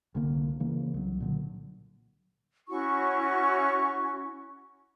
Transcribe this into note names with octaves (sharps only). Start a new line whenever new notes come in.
C2 D3 A#3
C#3 E3 A#3
C2 F#3
A#2 D3 F#3
C#4 E4 F#4 C#6